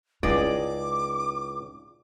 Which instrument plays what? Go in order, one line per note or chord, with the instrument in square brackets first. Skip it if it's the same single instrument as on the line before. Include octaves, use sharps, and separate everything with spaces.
[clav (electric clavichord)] C#2 G#4 D#5 [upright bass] D#4 E4 [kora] D5 [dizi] D6